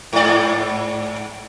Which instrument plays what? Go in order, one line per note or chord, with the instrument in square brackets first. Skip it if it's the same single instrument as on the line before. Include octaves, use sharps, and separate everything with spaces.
[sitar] G#2 D5